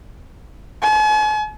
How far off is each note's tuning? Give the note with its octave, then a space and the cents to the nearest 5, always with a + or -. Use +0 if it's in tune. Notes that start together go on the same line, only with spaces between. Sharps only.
G#5 +45